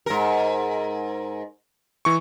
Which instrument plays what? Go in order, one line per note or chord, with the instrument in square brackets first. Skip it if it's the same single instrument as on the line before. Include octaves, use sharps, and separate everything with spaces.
[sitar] G#2 A#4
[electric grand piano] E3 C#6